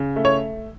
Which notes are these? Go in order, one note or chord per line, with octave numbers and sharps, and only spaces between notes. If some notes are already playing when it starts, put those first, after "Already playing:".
Already playing: C#3
A3
C#5